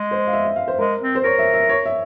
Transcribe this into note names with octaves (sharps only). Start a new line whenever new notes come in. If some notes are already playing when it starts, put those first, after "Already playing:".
Already playing: G#3
C5
F5
E5
E5
F5
C5
G#3 A#4
C4
C5
A#4 C#5
E5
E5
C#5
E5